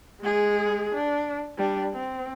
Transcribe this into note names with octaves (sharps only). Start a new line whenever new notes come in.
G#3 G#4
D4
G3 D4
C4